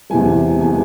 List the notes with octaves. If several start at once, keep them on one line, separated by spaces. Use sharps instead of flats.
E2 C3 E3 G#3 G#5
C3 E3 G#3 G#5